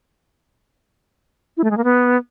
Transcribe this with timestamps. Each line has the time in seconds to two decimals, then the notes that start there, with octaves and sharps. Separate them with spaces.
1.57 E4
1.64 A3
1.71 G#3
1.77 A#3
1.84 B3